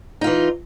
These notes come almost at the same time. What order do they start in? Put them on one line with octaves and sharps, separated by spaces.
D#4 F4 E3